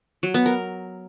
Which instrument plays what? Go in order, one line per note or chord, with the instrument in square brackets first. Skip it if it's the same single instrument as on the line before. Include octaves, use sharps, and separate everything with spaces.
[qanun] F#3
B3
A#4